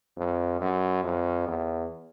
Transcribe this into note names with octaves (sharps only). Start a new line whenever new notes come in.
F2
F#2
F2
E2